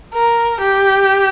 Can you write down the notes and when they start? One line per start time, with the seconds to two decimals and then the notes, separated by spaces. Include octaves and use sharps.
0.14 A#4
0.61 G4